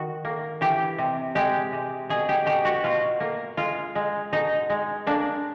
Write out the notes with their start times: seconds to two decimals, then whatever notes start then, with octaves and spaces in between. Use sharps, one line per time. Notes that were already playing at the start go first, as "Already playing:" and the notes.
Already playing: D#3 F#4
0.25 A#3
0.61 E3 G4
0.98 C3
1.35 G#3 G4
1.72 C3
2.09 B2 G#4
2.29 G4
2.46 B2 G4
2.65 F#4
2.84 B2 F4
3.20 A#3
3.57 G#3 F4
3.95 G#3
4.33 B2 D#4
4.70 G#3
5.07 A#3 D4